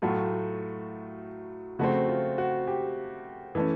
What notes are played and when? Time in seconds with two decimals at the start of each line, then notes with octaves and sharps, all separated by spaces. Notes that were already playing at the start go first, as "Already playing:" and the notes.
0.02 A2 F#3 A3 F4
1.79 C#3 F3 A3 C4 F#4
2.08 F4
2.38 F#4
2.67 G4
3.55 E3 A3 C#4